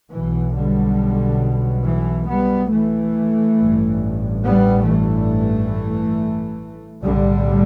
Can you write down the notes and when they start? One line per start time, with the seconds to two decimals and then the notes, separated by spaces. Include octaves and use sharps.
0.12 B1 B2 E3
0.55 D3 G3
1.85 E3
2.28 G3 B3
2.71 E3 A3
3.58 A1 G2
4.44 G3 B3
4.87 E3 A3
7.02 B1 A2 D3 G3